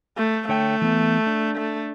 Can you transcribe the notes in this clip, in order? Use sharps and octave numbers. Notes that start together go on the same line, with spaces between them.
A3
D3 A3 C#5 G5
E3 B3
D4
A3